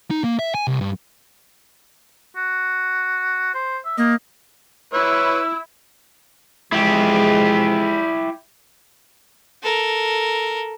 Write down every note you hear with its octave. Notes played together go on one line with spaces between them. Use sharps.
D#4
A#3
E5
G#5
C2
G2
F#4
C5
E5
A#3 D#5
E4 B4 C#5 E6
E3 F3 G#3 E4 G4
A4 A#4